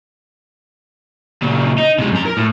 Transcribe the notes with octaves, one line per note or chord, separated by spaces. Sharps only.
A#2 C#3
D#4
C3 G#3
F#2 A#5
A#4
A2